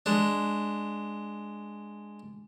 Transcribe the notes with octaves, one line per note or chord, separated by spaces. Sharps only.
G#3 D4